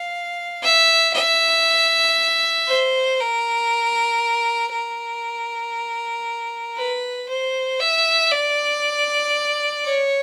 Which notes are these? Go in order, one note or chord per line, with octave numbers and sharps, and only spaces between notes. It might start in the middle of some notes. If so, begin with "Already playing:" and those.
Already playing: F5
E5
E5
C5
A#4
A#4
B4
C5
E5
D5
C#5